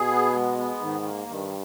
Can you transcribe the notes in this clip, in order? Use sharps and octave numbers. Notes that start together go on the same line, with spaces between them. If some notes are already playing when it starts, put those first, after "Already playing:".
Already playing: B2 G#4
B3
G#3
B3
G#2 D#3
A#3
G2 D#3